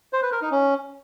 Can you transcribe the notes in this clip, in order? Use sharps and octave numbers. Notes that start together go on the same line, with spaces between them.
C5
B4
A#4
D#4
C#4